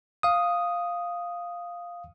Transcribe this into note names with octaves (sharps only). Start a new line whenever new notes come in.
F5 D#6